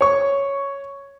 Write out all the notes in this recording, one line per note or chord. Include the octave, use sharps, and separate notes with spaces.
C#5 C#6